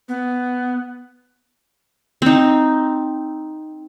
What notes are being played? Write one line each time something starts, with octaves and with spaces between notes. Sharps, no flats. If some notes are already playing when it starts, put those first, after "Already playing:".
B3
C4 D#4